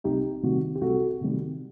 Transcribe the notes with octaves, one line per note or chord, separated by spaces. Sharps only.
C2 D#4 G4
C3 D#3 G3 F#4
G4
C2 F#4 A4
C3 D#3 G3